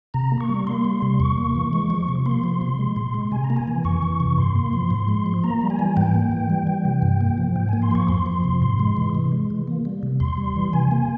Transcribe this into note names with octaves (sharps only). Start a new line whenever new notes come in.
C3 A#5
A#3
C#6
G3
A#3 C6
G3
C3
E2 C#6
A#3
E3
G#3
F3
C3
A#3 C6
F3
C3
G#3
A#2
G#3
C3 G#5
A#5
A#3
G#5
E3
F2 C#6
E3
C3
G2 C6
A#3
F3
G#2
G#3
F3
A#3 A#5
G3
G#5
E3
G#2 G5
A#3
E3
G3
E3
C3
G2
A#3
F3
G#2 G5
A#3 G#5
C6
F3 C#6
F2 C6
F3
C3
G#2 C6
G#3
E3
C3
G#3
E3
A#3
G3
C3
E2 C6
G3
E3
C3 G#5
A#3